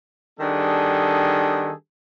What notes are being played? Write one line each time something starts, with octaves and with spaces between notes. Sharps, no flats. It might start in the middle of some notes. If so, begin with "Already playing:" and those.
D#3 G3 B3 D4 G#4 A4